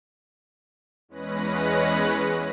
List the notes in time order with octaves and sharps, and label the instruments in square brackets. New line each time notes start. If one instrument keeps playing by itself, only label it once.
[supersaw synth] E2 G#3 C#4 B4 F#6 A#6